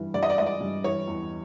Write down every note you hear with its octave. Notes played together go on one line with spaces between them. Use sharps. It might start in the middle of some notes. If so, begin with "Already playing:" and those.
Already playing: G2 E3
G2 D5
D#5
D5
G#3 D#5
D5
G2
E3 C#5
E2